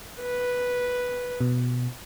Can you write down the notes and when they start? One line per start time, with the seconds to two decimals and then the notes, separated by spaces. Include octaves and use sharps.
0.20 B4
1.41 B2